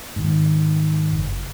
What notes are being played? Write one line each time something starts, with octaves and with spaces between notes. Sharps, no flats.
G#2 D#3
F#1